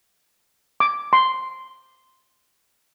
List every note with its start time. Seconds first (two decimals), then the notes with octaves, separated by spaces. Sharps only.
0.80 D6
1.13 C6